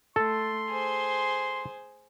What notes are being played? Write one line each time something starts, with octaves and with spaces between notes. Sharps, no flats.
A3 A4 C6
G#4 C5